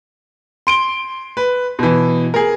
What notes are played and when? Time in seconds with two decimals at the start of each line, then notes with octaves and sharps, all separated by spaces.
0.67 C6 D7 G7
1.37 B4
1.79 B2 E3
2.34 G#4 A#4